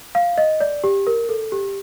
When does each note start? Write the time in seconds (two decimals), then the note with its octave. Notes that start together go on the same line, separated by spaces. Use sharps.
0.15 F5
0.38 D#5
0.61 D5
0.84 G4
1.07 A#4
1.29 A4
1.52 G4